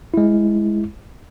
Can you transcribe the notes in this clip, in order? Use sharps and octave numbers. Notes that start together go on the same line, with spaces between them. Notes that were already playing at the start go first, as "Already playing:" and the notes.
G#3 E4